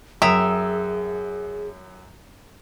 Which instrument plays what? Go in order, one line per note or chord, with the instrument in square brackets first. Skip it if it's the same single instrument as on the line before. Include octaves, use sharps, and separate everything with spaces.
[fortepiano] F#2 [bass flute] G#4 [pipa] E5 [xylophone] G5 A#5 D#6